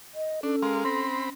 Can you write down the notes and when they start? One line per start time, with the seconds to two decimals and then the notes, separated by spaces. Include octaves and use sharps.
0.14 D#5
0.43 C#4 D4 A4
0.62 G#3 A#4 F5 C6
0.85 C4 B5 C6 A#6 C7